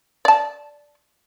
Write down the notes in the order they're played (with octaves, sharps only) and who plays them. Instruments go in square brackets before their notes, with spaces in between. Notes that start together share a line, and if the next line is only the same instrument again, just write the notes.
[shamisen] D5 A5